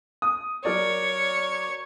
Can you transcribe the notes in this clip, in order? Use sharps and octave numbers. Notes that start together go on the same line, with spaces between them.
D#6
F#3 A#4 C#5 D5